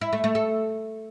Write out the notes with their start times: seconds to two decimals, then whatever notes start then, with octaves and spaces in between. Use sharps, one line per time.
0.01 E4
0.13 A3
0.24 A3
0.35 A4